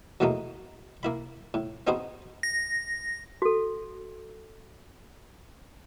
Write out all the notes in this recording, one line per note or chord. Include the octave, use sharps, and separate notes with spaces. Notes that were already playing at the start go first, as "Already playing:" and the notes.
E2 B2 F#3 A3 A#3 D#4
A#3 E4 B5
A2
B3 C4 D#4 F#4 G#4 C5
A#6
F#4 A4